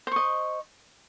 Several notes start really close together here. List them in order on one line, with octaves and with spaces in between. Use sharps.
C5 C#6 D#5